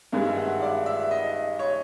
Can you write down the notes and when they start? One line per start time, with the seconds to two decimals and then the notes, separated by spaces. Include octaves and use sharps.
0.13 G2 D#3 G#3 A#4
0.25 E5
0.37 F#5
0.49 E5
0.62 D5
0.86 E5
1.11 D#5
1.59 C#5